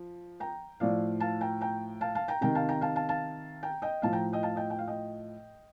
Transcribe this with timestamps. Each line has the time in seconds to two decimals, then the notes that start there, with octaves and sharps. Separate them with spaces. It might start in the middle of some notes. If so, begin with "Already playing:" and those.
Already playing: F3
0.40 G5 A#5
0.80 A2 F3 D5 F5
1.20 F5 A5
1.41 G5 A#5
1.61 G5 A#5
2.01 F5 A5
2.15 F5 A5
2.28 G5 A#5
2.41 C3 D#3 G5 A#5
2.55 F5 A5
2.69 G5 A#5
2.81 F5 A5
2.96 F5 A5
3.09 F5 A5
3.63 G5 A#5
3.82 D#5 G5
4.02 A2 F3 F5 A5
4.13 G5 A#5
4.33 D#5 G5
4.43 F5 A5
4.56 D#5 G5
4.70 G5
4.79 F5
4.88 D#5 G5